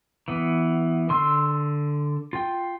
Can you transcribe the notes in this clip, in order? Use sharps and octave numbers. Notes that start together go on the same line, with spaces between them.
E3 B3
D3 C6 E6
F4 G5